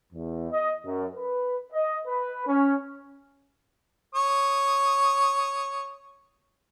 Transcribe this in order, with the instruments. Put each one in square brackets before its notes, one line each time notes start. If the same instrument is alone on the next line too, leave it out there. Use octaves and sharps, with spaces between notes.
[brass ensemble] E2
D#5
F#2
B4
D#5
B4
C#4
[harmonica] C#5 D#6